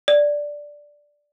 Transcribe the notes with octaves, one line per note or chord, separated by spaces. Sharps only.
D5